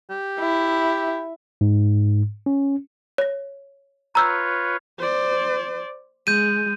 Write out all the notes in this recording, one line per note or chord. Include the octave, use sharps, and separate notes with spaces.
G4
E4
G#2
C#4
C#5 A#6
F4 B4 C#5 A#5 E6 G6
C5 D5
G#3 G6 D#7